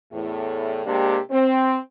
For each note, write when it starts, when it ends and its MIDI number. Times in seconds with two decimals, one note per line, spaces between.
0.12 0.81 40
0.12 0.81 45
0.86 1.19 48
0.86 1.19 56
0.86 1.19 58
0.86 1.19 62
0.86 1.19 67
1.31 1.79 60